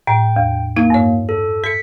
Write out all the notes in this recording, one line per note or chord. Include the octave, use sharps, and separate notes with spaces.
A2 G5
E2
A#3 D#4 G#6
G2 C#5
A4
A4 B6 C#7